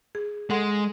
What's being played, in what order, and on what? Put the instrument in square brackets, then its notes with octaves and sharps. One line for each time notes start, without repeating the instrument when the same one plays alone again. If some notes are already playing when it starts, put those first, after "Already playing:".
[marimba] G#4
[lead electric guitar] G#3 [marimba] A4 F#5 C6